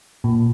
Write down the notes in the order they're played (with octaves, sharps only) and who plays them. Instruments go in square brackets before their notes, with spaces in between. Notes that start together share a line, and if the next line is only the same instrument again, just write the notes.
[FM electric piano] A#2